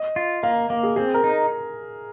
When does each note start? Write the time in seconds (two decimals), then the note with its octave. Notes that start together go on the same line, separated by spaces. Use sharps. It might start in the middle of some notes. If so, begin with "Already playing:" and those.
Already playing: D#5
0.16 F4
0.43 A#3 F5
0.70 A#3 F5
0.83 G#4
0.96 C4 G#4
1.14 A#4
1.24 D#4